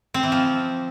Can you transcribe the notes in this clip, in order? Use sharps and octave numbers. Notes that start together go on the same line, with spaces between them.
C4
E3
F3